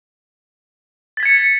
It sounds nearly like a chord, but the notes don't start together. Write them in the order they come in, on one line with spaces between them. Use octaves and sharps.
A6 B6 G#6 C#7